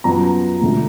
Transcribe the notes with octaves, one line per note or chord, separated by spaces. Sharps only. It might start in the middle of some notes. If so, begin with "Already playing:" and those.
F#2 F3 B3 A#5
D2 D3 G#3